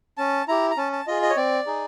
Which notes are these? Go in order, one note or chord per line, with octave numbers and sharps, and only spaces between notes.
C#4 A5
E4 G4 A#5
A#5
C#4 A5
A5
F4 G#4 D#5
D#5
C#5
C4 D5
D#4 G#4